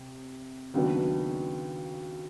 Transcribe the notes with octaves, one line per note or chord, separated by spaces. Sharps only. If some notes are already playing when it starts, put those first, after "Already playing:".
Already playing: C3
D#2 C#3 F#3 B3 D4